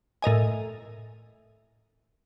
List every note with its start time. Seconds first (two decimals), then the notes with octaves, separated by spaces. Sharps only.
0.22 A2 A#4 D#5 G#5